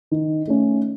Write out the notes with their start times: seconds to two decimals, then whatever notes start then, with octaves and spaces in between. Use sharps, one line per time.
0.11 D#3
0.47 A3 C#4